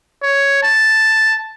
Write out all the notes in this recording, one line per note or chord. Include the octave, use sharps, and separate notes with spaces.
C#5
A5